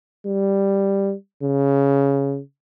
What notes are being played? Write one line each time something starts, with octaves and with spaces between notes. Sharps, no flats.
G3
C#3